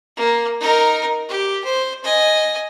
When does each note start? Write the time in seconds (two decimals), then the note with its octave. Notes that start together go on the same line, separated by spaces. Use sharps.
0.17 A#3
0.60 D#4 A#4
1.29 G4
1.64 C5
2.03 D#5 G#5